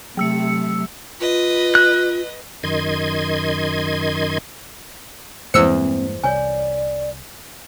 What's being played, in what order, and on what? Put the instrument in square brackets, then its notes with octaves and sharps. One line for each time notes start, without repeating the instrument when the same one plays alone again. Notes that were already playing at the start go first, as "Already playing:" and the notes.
[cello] C3 A3 [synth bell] F#3 E6 C#7
[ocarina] F4 [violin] B4 D#5
[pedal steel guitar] F#6
[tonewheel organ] F#2 D#3 D#5 C6 G#6
[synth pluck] E2 E6 C#7 [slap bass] G2 G#3 A#3 [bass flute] C4 [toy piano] C5
[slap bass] C2 [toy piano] C#5 G#5 [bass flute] D5